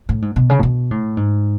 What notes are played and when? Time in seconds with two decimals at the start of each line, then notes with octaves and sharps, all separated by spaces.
0.09 A2
0.22 G#2
0.36 B2
0.50 C#3
0.59 A2
0.63 B2
0.91 A2
1.17 G#2